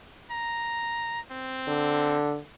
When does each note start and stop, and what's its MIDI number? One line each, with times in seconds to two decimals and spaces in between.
0.31 1.20 82
1.31 2.18 60
1.68 2.38 50